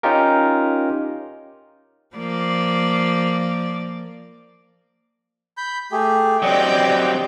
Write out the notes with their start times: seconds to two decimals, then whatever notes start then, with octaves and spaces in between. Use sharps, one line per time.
0.03 C#4 D#4 F4 G4 A#4
2.16 F3 A#3 D5
5.57 B5 G6
5.92 A3 G4 G#4
6.42 F#3 C4 G4 D5 D#5 G5